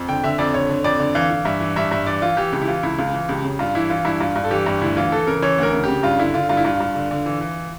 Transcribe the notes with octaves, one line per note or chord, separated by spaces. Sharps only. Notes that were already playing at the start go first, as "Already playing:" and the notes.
Already playing: F2
D3 G5
D3 E5
F2 D5
D3 C#5
D3
F2 D5
D3
E3 F5
E3
G2 E5
E3
G2 E5
G2 E5
E3 D5
E3 F4
E3 G4
C#2 G4
E4
E3 F4
C#2 E4
C#2 F4
E3
C#2 G4
C#3
G2 F4
E3 E4
E3 F4
G2 E4
G2 F4
G2
A4
E3 G4
G2
D2 E4
E3 F4
E3 A4
C#3 A#4
E3 C#5
D2 A#4
C#3
C#3 G4
G2 F4
D3 E4
D3 F4
G2 F4
E4
G2 F4
G2
D3
D3
E3
E3